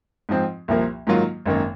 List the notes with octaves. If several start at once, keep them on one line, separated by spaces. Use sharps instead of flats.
G#2 F3 C4
C2 A#2 F3 A#3
G#2 D#3 F#3 A#3 F4
G#1 F#2 D#3 A#3